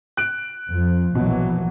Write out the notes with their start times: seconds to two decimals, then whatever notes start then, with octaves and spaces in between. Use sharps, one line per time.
0.17 F#6 D7
0.69 F2 F3
1.15 A#1 B2 E3 F#3